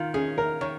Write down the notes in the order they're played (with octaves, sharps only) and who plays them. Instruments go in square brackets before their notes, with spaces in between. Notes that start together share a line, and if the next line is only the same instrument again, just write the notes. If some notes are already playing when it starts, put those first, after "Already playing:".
Already playing: [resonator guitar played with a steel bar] D#3 [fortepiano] F4
[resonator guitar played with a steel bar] C#4 [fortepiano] G#4
[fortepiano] A#4
[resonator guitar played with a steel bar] D#3 [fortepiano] C#5